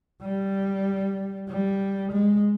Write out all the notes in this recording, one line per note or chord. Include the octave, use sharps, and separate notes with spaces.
G3
G3
G#3